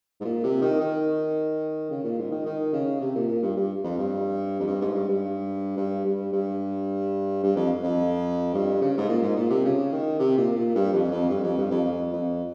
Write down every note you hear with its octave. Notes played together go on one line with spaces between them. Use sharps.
G#2
A#2
C3
D#3
D#3
C#3
A#2
G#2
D#3
D#3
C#3
C3
A#2
A#2
G2
G2
F2
G2
F2
G2
G#2
G2
G2
G2
G2
G2
G2
F2
F2
G2
C#3
G#2
A#2
G#2
A#2
C3
C#3
D#3
C3
A#2
A#2
G2
F2
F2
G2
F2
G2
F2
F2
F2